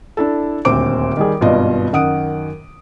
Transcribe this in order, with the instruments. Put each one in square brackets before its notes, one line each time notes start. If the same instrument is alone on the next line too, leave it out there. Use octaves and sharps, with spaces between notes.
[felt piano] D4 E4 A4
D#1 D2 C4 C5 D6 D7
D#3 G3 G#4
G#1 G2 B2 F4 D#5
F#2 D#3 F#5 D#6 D7